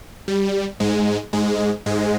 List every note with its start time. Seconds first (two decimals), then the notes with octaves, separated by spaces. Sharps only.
0.28 G3
0.80 G#2 G#3
1.33 G#2 G#3
1.86 G#2 G#3